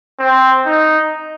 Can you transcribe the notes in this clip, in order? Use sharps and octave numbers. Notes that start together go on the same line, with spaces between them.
C4
D#4